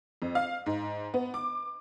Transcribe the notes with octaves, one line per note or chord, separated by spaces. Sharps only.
F2
F5
G#2
B3
D6